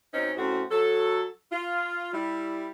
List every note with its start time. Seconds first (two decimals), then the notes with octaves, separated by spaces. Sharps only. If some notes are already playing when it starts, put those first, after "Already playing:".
0.14 F#2 C4 C#4 D#4
0.37 F#2 A2 C4 F#4
0.71 F#3 A4
1.52 F4
2.14 G3 E4